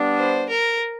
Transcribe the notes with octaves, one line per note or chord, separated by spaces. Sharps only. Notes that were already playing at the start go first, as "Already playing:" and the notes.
Already playing: G3 B3 D4
C5
A#4